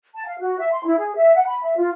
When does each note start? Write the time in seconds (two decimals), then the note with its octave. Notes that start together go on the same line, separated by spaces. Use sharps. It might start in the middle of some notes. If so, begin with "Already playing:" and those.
0.14 A5
0.25 F5
0.39 F#4
0.59 E5
0.72 C6
0.84 E4
0.98 G#4
1.15 E5
1.36 F#5
1.47 B5
1.63 E5
1.77 F4